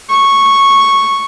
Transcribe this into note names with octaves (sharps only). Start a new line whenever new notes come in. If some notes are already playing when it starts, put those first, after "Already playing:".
C#6